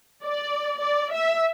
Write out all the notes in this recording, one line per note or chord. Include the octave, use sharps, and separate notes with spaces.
D5
D5
E5